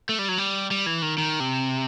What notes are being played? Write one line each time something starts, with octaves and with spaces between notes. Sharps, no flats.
A3
G3
F#3
G3
G3
E3
D#3
D#3
C3